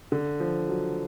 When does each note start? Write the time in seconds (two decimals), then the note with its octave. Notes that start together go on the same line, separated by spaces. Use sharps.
0.12 D3
0.40 F3
0.69 F#3